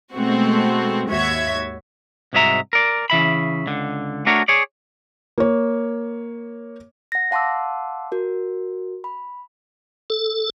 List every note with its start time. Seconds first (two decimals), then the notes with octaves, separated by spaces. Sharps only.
0.14 B2 G#3 A3 C4 F#4
1.10 D#2 G#2 F#4 C#5 E5 G#6
2.33 C2 G#2 G#3 F#4 E5 A#5
2.73 A#4 D5
3.10 C#3 E3 E5 B5
3.66 C#2 D3
4.26 A3 D4 F#4 A#4 C#5
4.48 G#4 C#5 D5
5.38 A#3 C#5
7.12 F#5 A#6
7.31 F5 F#5 A5 C6 D6 E6
8.12 F#4 A#4
9.04 B5
10.10 A4